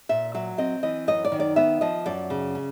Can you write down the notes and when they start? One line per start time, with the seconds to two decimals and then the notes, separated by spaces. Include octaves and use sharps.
0.09 A#2 E5
0.34 F#3 E5
0.58 C4 D#5
0.83 E3 D#5
1.08 F#2 D#5
1.25 D5
1.32 D#3
1.40 D5
1.56 B3 E5
1.81 F3 D#5
2.06 F#2 D5
2.30 C#3
2.55 C#4